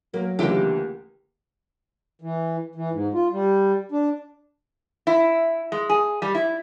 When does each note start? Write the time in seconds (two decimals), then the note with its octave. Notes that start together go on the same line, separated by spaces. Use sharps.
0.14 F#3 A#3
0.39 C#2 D3 E3 A#3 G4
2.22 E3
2.75 E3
2.92 G#2
3.14 F4
3.32 G3
3.92 D4
5.07 E4
5.72 G#3
5.89 G#4
6.22 G3
6.35 E4